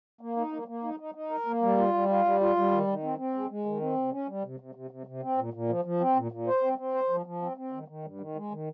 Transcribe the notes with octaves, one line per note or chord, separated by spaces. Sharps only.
A#3
D#4
A#3
A#3
D#4
D#4
D#4
A#4
A#3
G3
F4
G3
F4
G3
F4
G3
D#3
D#3
C4
C4
G#3
G#3
D#3
C4
C3
C#4
G3
C3
C3
C3
C3
C3
C4
A#2
A#2
F3
F3
C4
A#2
A#2
C5
C4
C4
C5
F3
F3
C4
C4
D#3
D#3
G2
D#3
G#3
D#3